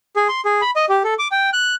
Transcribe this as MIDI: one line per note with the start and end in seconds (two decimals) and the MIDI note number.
0.16 0.28 68
0.28 0.41 84
0.45 0.61 68
0.61 0.71 83
0.76 0.85 75
0.89 1.03 67
1.04 1.14 69
1.19 1.28 86
1.31 1.50 79
1.53 1.75 90